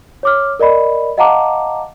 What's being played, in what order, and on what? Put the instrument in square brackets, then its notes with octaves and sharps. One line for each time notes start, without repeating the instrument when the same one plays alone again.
[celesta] C#5 D6 F6
A#4 D5 D#5 B5
D#5 F5 F#5 A5 A#5 D6